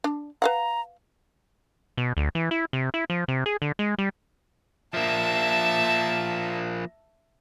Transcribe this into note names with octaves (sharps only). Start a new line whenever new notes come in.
D4
B4 F5 F#5 A#5
B2
D2
E3
E4
C3
E4
F3
C3
G#4
D3
G#3
G3
F3 A#3 E5 A5